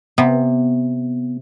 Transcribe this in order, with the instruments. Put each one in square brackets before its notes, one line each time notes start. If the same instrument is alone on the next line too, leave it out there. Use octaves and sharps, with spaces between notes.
[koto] C3 [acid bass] B3